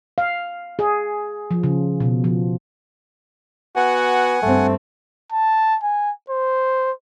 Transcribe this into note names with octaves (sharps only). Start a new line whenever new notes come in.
F5
G#4
F3
C#3
B2
F3
B3 F#4 F#5 G#5
G2 A3 C4
A5
G#5
C5